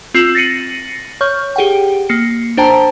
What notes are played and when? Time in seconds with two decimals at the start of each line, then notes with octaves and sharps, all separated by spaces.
0.14 C4 F4 E6 C7 E7 F#7
0.35 A6 A#6 C7 C#7 D#7 F#7
1.21 C#5 C#6 F6 G6
1.56 G4 G#4 F#5 G5
2.09 A#3 C7 C#7
2.57 D4 C5 G5 A5 A#5